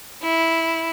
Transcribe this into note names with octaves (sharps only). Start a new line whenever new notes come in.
E4